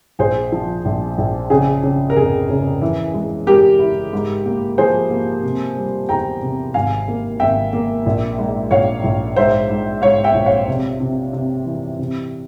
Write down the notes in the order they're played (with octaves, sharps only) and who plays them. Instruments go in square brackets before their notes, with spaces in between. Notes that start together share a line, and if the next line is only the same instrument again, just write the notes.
[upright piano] A#1 G#4 C5
F3
A#1
A#1
C#3 G#4
C#3
A#4
F1 G#4
C#3
E3
G#3
G#3 G4 A#4
E4
G#2
A#3
F3 G#4 C5
A#3
C3
G3
E2 G5 A#5
C3
G#1 F5 G#5
A#3
G#1 E5 G5
A#3
A#1
G#2
A#1 C#5 F5
A#1
G#2 C5 E5
G#2
G#2 C#5 F5
E5 G5
A#1
C#5 F5
C3
C3
C3
E3
C3